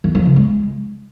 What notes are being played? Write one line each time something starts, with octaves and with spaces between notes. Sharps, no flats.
E3
F3
C#3
G#3